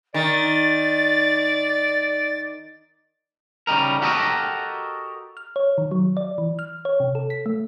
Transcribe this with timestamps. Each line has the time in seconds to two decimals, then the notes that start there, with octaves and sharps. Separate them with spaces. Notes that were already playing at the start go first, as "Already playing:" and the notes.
0.14 D#3 D5 A6
3.67 C#3 G3 D#4 A#4
4.02 F#4 G4 A4 A#4 C5 D#5
5.37 F6
5.56 C#5
5.78 D#3
5.91 F#3
6.17 D5
6.38 E3
6.59 F6
6.85 C#5
7.00 C3
7.15 A4
7.30 B6
7.46 A3